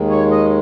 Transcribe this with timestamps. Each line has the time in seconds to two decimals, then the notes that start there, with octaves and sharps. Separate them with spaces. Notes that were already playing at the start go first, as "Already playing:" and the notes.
Already playing: D#2 D#3 G#3
0.10 C#5
0.31 D#5